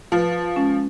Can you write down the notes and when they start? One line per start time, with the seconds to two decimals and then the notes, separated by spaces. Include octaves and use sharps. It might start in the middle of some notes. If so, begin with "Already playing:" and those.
0.12 F3 F4 B4
0.32 F4
0.56 G#3 C#4